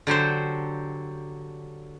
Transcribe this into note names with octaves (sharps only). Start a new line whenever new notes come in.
D3 F#3 G4 C5